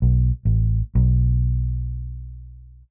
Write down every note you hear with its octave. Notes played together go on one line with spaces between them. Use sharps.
B1
A1
B1